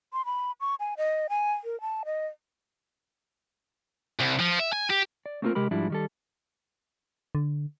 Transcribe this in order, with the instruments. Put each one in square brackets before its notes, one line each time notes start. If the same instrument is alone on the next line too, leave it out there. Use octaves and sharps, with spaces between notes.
[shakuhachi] C6
B5
C#6
G#5
D#5
G#5
A#4
A5
D#5
[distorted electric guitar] C2
F3
E5
G#5
G4
[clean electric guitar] D5
A3 A#3 C4 D4 F4 A#4
C3 G#3 G4 A#4 B5
G#2 F3 G3 D4 E4
D#3 G3 A4
[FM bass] D3